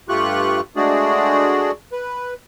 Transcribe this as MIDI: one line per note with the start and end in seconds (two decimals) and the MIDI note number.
0.09 0.60 43
0.09 0.60 57
0.09 0.60 65
0.09 0.60 67
0.09 0.60 85
0.09 0.60 90
0.76 1.71 56
0.76 1.71 57
0.76 1.71 62
0.76 1.71 66
0.76 1.71 68
0.76 1.71 74
1.92 2.34 71